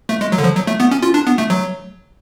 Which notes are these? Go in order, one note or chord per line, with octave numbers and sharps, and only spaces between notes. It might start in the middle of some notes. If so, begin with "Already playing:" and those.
A3
G#3
F#3
D3
F3
F#3
A3
B3
C#4
F4
D4
B3
A3
F#3